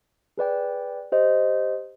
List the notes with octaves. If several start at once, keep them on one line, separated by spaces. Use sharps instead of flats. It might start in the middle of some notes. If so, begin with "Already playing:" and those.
G#4 B4 D5 G5
G4 C5 D#5